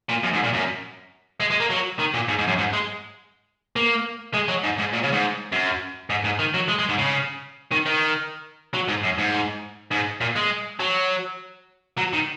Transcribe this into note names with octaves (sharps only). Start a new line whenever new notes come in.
A#2
F#2
G#2
A#2
F#2
G#3
G#3
A#3
F#3
D#3
A#2
G#2
G#2
F#2
G#2
G#3
A#3
G#3
F#3
G#2
G#2
A#2
C#3
G#2
F#2
G#2
G#2
D#3
F#3
G#3
G#3
G#2
C#3
D#3
D#3
F#3
G#2
F#2
G#2
G#2
A#2
G#3
F#3
F#3
D#3